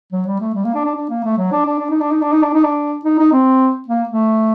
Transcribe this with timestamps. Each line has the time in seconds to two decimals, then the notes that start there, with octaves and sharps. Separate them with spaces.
0.13 F#3
0.27 G3
0.40 A3
0.54 G3
0.65 A#3
0.75 D4
0.85 D4
0.95 D4
1.10 A#3
1.24 A3
1.38 F#3
1.52 D4
1.66 D4
1.79 D4
1.91 D#4
2.01 D4
2.11 D#4
2.22 D4
2.33 D#4
2.43 D4
2.54 D#4
2.64 D4
3.05 D#4
3.19 D#4
3.33 C4
3.88 A#3
4.09 A3